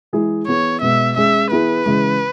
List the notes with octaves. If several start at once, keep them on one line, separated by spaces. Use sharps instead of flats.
E3 G#3 E4 G#4
E3 B3 G#4 C#5
B2 G#3 B3 E5
G#3 C#4 G#4 E5
E3 B3 E4 G#4 B4
C#3 E3 G#3